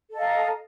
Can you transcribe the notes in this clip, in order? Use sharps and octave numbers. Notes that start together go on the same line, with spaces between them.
A4 D#5 F5 A#5